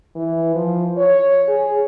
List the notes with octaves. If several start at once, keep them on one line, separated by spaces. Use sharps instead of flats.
E3
F3
C#5
G#4